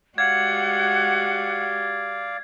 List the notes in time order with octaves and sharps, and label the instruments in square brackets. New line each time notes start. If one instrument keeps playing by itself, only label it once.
[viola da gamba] G#3 F#4 G4 [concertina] D5 F5 [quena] F#5 [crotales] G#6